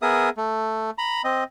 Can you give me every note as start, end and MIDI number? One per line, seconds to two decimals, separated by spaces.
0.02 0.29 59
0.02 0.29 68
0.02 0.29 70
0.02 0.29 76
0.02 0.29 87
0.37 0.90 57
0.98 1.22 82
0.98 1.22 83
1.24 1.44 60
1.24 1.44 75